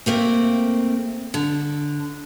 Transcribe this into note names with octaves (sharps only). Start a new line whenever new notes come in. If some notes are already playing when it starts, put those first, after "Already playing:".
C3 A3 A#3 C4
D3